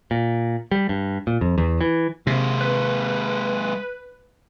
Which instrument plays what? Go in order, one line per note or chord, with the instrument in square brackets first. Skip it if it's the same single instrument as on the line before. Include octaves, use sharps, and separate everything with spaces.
[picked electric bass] A#2
G3
G2
A#2
F2
E2
E3
[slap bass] C3 [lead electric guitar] G#3 A#3
[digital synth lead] B4